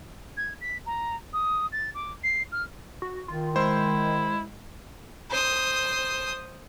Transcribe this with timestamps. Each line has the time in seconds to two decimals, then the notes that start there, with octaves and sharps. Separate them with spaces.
0.37 G#6
0.61 B6
0.86 A#5
1.33 D#6
1.72 A6
1.94 D6
2.23 C7
2.52 F6
3.02 F#4
3.28 D#3 F4
3.56 G#3 E4 C5
5.30 C5 D#6